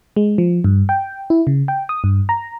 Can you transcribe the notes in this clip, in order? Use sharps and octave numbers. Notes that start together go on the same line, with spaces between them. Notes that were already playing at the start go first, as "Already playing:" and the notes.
G#3
F3
G2
G5
E4
C#3
G5
D#6
G2
A#5